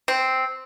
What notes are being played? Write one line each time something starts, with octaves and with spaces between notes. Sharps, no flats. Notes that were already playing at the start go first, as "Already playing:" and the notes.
C4